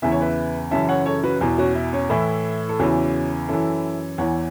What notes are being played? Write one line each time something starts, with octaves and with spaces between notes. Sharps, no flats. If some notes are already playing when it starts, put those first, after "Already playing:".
E2 C#3 E3 E5
C#5
B4 E5
F#2 C#3 E3 E5 A5
C#5 F#5
A4 C#5
F#4 B4
E2 B2
C#4 F#4
E4
C#4
A2 E3 E4
A4
E2 C#3 E3 C#4 F#4
F#2 E3 E4 A4
E2 E3 C#5 F#5